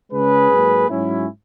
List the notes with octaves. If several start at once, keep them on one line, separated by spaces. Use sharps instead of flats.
C#2 C#3 G#3 C#4 G#4 B4
G#2 F#3 A#3
G#2 F#3 C#4 E4